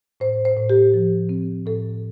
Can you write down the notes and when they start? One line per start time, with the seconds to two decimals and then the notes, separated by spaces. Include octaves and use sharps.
0.20 A2 C5
0.45 C5
0.57 A2
0.70 G4
0.94 F3
1.29 C4
1.66 A2 A4